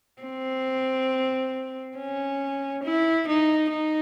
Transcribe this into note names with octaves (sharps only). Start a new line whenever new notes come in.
C4
C#4
E4
D#4
D#4